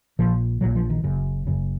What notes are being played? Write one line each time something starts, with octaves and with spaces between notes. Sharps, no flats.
A#1 A#2 F3
A#1 A#2 F#3
F3
D#3
F#1 F#2 C#3
F#1 F#2 C#3